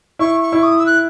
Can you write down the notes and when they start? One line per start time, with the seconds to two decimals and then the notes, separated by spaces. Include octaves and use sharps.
0.19 E4 C#6
0.42 C#6
0.52 E4
0.63 D#6
0.80 E6
0.86 F#6